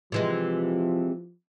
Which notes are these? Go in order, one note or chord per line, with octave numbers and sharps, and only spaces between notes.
C3 E3 F3 G#3